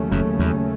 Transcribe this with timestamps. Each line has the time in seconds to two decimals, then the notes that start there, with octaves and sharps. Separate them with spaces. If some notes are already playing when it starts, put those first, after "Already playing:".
Already playing: D#2 C#3 F#3 A3 C#4
0.11 F#1 F#2
0.40 E2